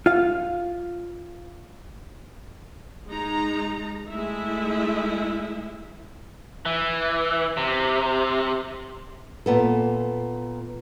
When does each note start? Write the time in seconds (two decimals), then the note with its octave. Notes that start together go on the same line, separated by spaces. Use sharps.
0.06 F4 F5
3.09 G#3 D#4 A#5
4.09 G#3 A3 E4 E5
6.66 E3
7.57 C3
9.46 A#2 B3 A4